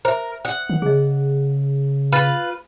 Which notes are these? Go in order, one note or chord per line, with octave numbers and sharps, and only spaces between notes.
A#4 C5 E5
F#5 D#6
D#3
C#3 G#4 D#5
F4 B4